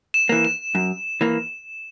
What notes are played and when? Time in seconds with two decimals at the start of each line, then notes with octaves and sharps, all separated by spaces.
0.14 E7
0.29 E3 A#3
0.45 E7
0.75 F#2
1.21 E3 A#3